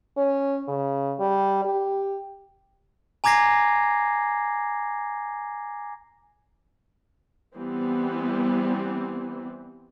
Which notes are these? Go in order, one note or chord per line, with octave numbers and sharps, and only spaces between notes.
C#4
C#3
G3
G4
G#5 A#5 D6 G#6 A#6 C7
E3 G3 B3 C4